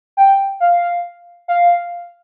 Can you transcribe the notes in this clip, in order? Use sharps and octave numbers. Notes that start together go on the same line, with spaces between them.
G5
F5
F5